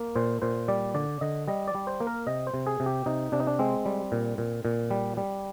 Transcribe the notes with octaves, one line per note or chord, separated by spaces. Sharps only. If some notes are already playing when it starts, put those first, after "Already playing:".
Already playing: A#3
A#2 C5
A#2 C5
G3 D5
D3 D5
D3 D#5
G3 D#5
D5
G3
C5
A#3
A#4
C3 D#5
C5
C3
G#4
C3
G4
C3 D#4
C3 D4
D#4
D4
G#3 C4
G3
A#2
A#2
A#2
G3
G3